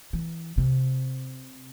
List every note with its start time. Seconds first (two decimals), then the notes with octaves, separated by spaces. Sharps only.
0.13 E3
0.58 C3